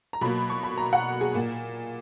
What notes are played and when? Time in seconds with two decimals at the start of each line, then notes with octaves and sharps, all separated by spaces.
0.13 A#5
0.21 B2 F#3 A#3 B5
0.50 C#6
0.63 B5
0.78 A#5
0.93 F#5
1.21 G#4
1.34 A#2 A#3